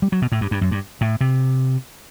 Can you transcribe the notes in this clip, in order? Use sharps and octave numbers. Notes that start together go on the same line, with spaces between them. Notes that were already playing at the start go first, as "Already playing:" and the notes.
G3
F#3
B2
A2
G2
G2
F#2
G2
A2
C3